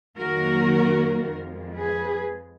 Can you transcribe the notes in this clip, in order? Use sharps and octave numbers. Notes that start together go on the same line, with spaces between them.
F2 D#3 F#3 A#3 F#4 A#4
F2 F3 G#3
G#4 B4